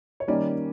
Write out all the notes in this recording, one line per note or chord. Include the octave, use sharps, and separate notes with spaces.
C#5
D#3 G3 A#3 C#4 D5